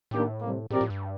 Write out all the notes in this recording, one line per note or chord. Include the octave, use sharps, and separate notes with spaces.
A2 D#3 A#3 D4 G4
C3 G3 A#3
A2 F3 C4 G4 A#4 D5
A2
G2